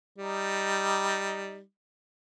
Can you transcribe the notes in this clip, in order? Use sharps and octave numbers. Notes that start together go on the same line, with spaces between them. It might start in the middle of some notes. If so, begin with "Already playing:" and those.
G3 D#4